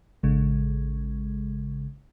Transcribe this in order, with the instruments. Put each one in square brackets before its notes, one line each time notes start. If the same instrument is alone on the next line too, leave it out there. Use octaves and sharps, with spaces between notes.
[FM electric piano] A1 C#3 G#3